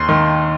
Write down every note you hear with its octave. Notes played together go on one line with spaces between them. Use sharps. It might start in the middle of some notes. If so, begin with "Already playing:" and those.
Already playing: D#2 C6
D#3